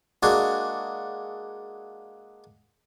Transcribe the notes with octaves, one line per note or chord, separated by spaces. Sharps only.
G#3 A#3 D4 F#4 G#4